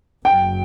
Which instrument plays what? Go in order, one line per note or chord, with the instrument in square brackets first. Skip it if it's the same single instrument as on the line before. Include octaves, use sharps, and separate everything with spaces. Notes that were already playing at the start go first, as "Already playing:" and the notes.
[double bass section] F#1 F#2 F#3 [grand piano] G5